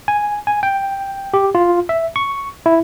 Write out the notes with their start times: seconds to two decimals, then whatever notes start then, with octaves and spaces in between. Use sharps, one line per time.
0.08 G#5
0.47 G#5
0.63 G5
1.34 G4
1.55 F4
1.89 E5
2.16 C#6
2.66 E4